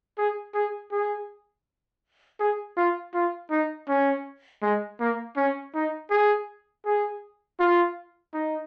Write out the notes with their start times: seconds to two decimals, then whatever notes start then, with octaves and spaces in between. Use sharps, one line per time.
0.18 G#4
0.54 G#4
0.92 G#4
2.40 G#4
2.77 F4
3.14 F4
3.51 D#4
3.89 C#4
4.62 G#3
5.00 A#3
5.36 C#4
5.74 D#4
6.10 G#4
6.86 G#4
7.60 F4
8.34 D#4